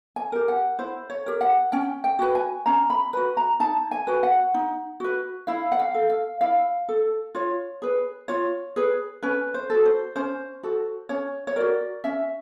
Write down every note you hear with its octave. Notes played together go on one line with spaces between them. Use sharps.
G#5
G4 A#4
F#5
E4 C5
C#5
G4 A#4
F#5
C#4 G5
G5
F#4 B4
G#5
C#4 A#5
B5
F#4 B4 B5
A#5
D#4 A5
G#5
F#4 B4
F#5
D#4
F#4 B4
E4 F5
F#5
F5
A4
F5
E4 F5
A4
F4 C#5
G#4 B4
F4 C#5
G#4 B4
C#4 B4
C5
F#4 A4
C5
C#4 C5
F#4 A4
C#4 C#5
C#5
F#4 A#4 D5
C#4 E5